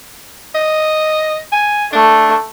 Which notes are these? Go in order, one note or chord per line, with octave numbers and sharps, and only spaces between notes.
D#5
G#5
A3 D4